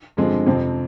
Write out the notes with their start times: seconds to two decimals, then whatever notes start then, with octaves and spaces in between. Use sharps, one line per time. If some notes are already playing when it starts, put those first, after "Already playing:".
0.17 G2 D3 F3 G#3 C4
0.46 F2 C3 F3 C4